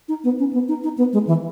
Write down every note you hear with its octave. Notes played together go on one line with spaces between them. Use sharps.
D#4
B3
C#4
B3
D#4
D#4
B3
G#3
E3